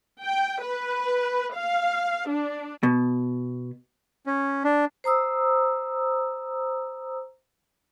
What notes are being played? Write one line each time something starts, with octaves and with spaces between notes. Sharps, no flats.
G5
B4
F5
D4
B2
C#4
D4
C5 A#5 D#6 E6